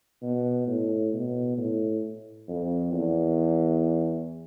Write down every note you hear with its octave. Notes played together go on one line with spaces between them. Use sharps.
B2
A2
B2
A2
F2
E2